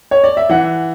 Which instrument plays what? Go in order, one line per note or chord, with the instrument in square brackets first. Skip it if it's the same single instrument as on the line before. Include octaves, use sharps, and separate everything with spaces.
[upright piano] C#5
D5
E5
E3 F#5